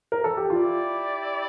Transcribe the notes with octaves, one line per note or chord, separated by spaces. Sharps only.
A#4
A4
G4
E4 F4 G4 D5